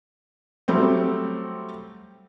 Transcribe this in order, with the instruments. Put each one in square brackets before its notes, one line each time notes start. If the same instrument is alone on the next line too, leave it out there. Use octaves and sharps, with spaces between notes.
[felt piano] F#3 G3 A3 C4